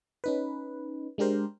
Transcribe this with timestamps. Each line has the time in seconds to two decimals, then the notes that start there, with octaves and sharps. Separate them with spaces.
0.24 C#4 D#4 B4
1.18 G#3 D4 G4 A#4 C5